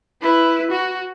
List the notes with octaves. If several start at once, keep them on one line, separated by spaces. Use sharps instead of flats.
E4 B4
F#4